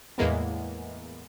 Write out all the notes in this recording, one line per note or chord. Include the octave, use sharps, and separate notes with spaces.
E2 A2 E3 G#3 A#3 B3